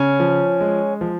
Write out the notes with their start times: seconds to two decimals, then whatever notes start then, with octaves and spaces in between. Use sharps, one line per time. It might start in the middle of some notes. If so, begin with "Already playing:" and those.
Already playing: C#3 C#4
0.20 F3
0.61 G#3
1.01 F3